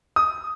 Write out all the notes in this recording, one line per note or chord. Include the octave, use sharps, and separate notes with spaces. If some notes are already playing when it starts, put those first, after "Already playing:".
D#6